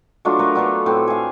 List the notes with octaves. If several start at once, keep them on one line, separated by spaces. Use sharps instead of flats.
F#3 A3 D4 F4
A3 A#4 B4
B3 D4 A4
A2 C4
F5 G#5